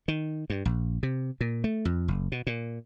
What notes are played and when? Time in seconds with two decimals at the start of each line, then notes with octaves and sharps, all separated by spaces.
0.08 D#3
0.50 G2
0.65 A#1
1.03 C3
1.41 A#2
1.64 A3
1.85 F2
2.08 F#1
2.32 B2
2.47 A#2